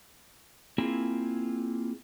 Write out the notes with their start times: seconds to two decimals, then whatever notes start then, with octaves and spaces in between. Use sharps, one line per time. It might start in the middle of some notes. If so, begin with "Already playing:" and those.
0.78 A#3 C4 E4 F4 G#4